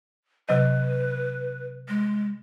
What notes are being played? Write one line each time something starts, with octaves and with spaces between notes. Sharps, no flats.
C3 F#3 B4 D#5
G#3